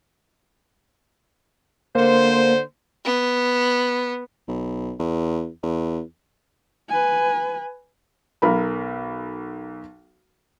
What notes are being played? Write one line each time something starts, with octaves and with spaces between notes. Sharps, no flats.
D3 A#3 C5
B3
B1
E2
E2
B4 G#5
B1 A#4 B5